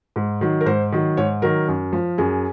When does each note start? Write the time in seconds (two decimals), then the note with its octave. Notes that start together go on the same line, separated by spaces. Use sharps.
0.16 G#2
0.41 D#3 F#3
0.61 A#4
0.66 G#2 C5
0.92 D#3 F#3
1.17 G#2 C#5
1.42 D#3 F#3 A#4
1.68 F#2
1.93 F3
2.18 F#2 G#4